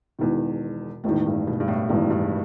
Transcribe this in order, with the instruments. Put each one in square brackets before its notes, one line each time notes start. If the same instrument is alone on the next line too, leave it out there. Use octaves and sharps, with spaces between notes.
[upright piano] E1 E2 D#3 [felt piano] B2
[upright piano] E1 E2 D#3 [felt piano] A2
[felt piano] G2
B2
G2
A2
[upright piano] E1 E2 D#3 [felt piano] G2
[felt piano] G2